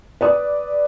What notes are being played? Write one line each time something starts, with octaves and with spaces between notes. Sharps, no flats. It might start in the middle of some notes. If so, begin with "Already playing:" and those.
B4 D5 D#6